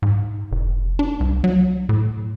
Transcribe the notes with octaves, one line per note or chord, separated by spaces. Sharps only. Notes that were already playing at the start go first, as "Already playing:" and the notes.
G#2
F1
D4
C2
F#3
A2